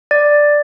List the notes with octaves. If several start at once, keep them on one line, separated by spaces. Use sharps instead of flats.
D5